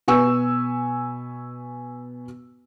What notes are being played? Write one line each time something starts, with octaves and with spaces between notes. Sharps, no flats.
B2 B4 G#5 C#6 E6